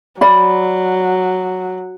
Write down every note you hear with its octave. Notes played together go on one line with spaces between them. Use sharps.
F#3 D5 B5